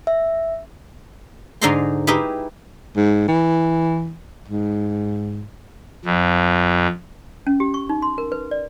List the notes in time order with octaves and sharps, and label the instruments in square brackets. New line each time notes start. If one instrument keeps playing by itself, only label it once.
[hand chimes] E5
[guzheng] G#2 D3 D#4 G#4 A#5 C6
D#4 E4 G4 G#4 B4
[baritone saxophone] G#2
E3
G#2
[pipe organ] F2
[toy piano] C#4
G4
C#6
D#4
C6
A#4
B4
D5